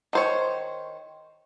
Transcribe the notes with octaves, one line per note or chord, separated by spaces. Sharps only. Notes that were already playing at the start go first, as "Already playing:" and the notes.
D#3 C5 C#5